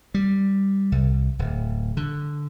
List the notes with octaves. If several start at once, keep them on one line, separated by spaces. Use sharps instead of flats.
G3
C2
D1
D3